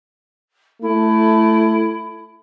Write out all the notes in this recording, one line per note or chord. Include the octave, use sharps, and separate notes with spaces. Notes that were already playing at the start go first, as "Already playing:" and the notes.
A3 E4